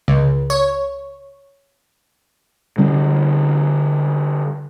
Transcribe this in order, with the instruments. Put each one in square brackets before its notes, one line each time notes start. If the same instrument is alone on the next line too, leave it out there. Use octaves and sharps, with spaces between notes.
[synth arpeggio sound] C#2
C#5
[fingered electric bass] D3 G3 C#4